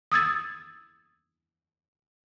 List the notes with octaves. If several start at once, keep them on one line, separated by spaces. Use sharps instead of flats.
D#6 E6 G#6 A6